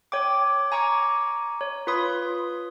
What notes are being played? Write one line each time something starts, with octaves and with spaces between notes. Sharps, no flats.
C#5 G5 D6
G#5 A#5 C#6 D6
C#5
F4 B4 B5 C6 D#6